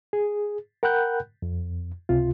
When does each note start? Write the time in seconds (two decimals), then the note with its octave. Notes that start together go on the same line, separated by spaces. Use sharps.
0.13 G#4
0.83 A#4 F#5 G5 B5 F#6 G6
1.42 F2
2.09 C#2 C3 F4